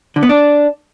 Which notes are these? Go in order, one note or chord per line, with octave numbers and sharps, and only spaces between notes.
D3
B3
D4